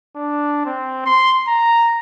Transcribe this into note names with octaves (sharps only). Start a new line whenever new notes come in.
D4
C4
C6
A#5